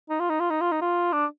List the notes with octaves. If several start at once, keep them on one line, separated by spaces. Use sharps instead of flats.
D#4
F4
D#4
F4
D#4
F4
D#4
F4
D4